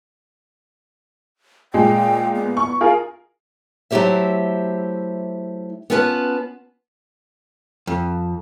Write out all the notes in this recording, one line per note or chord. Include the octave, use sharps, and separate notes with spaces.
A#2 G#3 G5
B3
C#6
F4 G#4 A#4
F#3 A3 E4 G4 C5 E5
B3 C#4 F4 B4 G#5 A5
F2